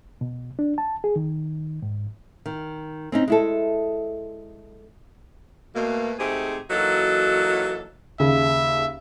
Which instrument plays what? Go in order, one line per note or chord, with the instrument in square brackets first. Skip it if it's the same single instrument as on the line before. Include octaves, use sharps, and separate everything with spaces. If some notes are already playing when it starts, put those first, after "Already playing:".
[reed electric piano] B2
D4
A5
G#4
D#3
G#2
[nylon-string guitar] D#3
C4 C#4 D#4
G#3 E4 A4
[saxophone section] B2 A3 A#3
G#2 C3 A3 G4 G#4
E3 F#3 A#3 D#4 F#4 A4
[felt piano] D#2 C#3 [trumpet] E5